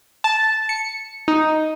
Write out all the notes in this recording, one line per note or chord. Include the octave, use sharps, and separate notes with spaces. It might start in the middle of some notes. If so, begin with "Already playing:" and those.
A5
C#7
D#4